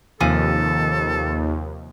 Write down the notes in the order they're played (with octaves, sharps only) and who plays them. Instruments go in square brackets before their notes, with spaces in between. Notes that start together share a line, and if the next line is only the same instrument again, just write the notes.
[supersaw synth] D#2 [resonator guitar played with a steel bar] C3 F3 G#5 [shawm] A4